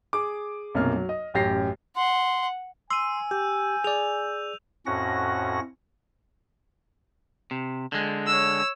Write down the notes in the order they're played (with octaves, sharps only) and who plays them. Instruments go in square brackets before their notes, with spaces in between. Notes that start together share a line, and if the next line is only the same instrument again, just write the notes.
[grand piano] G#4 D6
B1 F#2 C3 A#3 F6
F#3
D#5
A1 F#2 G4 A#6 C7
[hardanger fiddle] F#5 [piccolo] C6
[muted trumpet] G#5 [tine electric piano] C6 [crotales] E6 D#7
[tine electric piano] G4 [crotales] G6
[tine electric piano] G#4 D5 [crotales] F7
[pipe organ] F2 A2 C#4 F#4 F#5 A#6
[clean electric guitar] C3
D3 G#3
[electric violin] C#5 E6